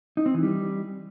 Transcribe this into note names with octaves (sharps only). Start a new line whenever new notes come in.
D#4
C4
E3
G3